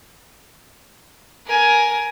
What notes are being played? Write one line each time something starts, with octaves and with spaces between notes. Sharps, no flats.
A#4 G#5